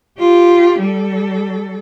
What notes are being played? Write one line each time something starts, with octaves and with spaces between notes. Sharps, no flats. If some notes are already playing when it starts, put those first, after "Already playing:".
F4 G4
G3 A4